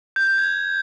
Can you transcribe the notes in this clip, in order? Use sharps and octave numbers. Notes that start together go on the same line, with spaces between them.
G6
G6
G#6